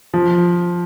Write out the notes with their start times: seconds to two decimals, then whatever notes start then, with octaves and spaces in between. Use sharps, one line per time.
0.14 F3